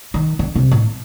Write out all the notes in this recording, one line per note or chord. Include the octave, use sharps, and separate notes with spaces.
D#3
D3
C3
A2